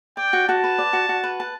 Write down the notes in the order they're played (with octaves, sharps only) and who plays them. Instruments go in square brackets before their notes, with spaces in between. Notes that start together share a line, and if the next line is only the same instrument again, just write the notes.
[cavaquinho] D5 [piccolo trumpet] G5
[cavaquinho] F#4
[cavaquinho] F#4 [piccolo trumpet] A5
[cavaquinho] B4
D5
F#4
F#4
B4
A5